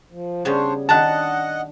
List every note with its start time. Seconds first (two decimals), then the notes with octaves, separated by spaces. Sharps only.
0.11 F3
0.45 C#3 G3 B3 D4 C5 C#5
0.89 D#3 D4 D#5 F#5 A5 A#5 F#6